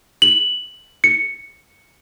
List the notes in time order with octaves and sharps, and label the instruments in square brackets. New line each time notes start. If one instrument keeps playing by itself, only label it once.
[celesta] F#7
C#7